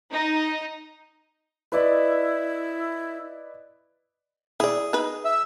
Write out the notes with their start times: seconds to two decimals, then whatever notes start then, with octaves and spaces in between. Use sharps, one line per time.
0.12 D#4
1.72 E4 B4 D5 D#5
4.60 E4 G#4 D5
4.93 D#4 B4
5.25 E5 E6